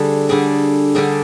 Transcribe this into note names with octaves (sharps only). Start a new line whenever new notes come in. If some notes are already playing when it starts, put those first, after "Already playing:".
Already playing: D3 G3 D4 G#4
D3 G3 D4 G#4
D3 G3 D4 G#4